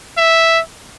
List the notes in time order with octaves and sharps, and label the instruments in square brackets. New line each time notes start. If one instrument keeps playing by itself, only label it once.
[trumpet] E5